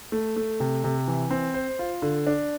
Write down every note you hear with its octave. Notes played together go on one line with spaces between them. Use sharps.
A3
A3
C3
C3
E3
C4
C5
F4
D3
D4